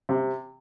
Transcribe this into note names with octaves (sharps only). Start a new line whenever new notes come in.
C3